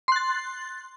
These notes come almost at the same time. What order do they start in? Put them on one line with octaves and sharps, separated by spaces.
C6 F#6 A6